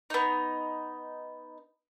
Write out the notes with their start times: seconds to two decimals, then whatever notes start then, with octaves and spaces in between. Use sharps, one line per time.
0.10 B3 D#4